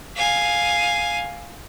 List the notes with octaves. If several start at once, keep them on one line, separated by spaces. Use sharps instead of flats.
F5 G#5